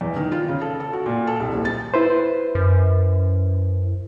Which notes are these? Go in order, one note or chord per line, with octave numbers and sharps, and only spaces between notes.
E2
D#3
F4
C#3
A4
A4
F#4
A#2
A4
C2
D#1
A6
E4 B4 C5
F#2